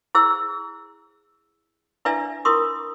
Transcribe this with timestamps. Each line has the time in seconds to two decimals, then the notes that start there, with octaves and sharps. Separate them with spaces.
0.15 E4 G#4 C5 E6
2.05 D4 E4 B4 D5 E5 G#5
2.45 E4 F4 A#4 C6 C#6 D#6